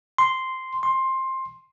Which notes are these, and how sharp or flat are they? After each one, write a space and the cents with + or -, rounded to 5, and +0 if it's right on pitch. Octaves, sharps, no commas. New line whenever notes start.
C6 -5
C6 +15